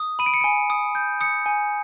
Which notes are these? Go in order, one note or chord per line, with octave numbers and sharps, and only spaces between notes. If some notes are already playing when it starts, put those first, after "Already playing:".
Already playing: D#6
B5 D#7
D7
C#7
G#5 D7
D#6
G6
D#6 C#7
G#5